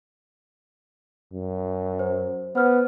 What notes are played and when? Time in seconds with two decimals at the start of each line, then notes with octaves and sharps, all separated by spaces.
1.33 F#2
1.99 C5
2.55 B3 C5 F6